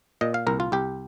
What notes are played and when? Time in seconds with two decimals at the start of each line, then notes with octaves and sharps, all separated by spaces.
0.21 A#2 D#5
0.34 F5
0.47 C2 A#4
0.60 F4
0.72 C2 G4